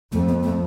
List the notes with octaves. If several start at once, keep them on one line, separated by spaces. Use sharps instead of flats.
F2 A3
B3
A3